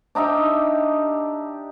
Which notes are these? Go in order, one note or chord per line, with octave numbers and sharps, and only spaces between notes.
D4 D#4 G4 E5